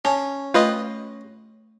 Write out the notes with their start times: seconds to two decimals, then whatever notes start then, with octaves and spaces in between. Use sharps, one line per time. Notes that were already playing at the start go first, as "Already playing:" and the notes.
0.05 C#4 G#5 A5
0.54 A3 F4 B4 D#5